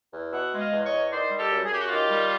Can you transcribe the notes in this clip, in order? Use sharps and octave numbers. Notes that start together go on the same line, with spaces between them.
E2
B2 E5 F#5
G#3
D#5 F5
E2
C#5 D#5
E2
D#3 C5 D5
G3
G4 A4
F#2
G#4
F#2 G4
F#4
D#3 F4 G4
G3